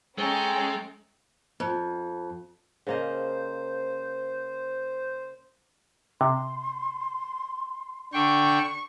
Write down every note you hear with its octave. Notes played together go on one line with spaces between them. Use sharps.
G#3 C#4 A4 G5 A#5
F2
C#3 A#3 C5 D#5
C3 C6
D3 D4 G5 C#6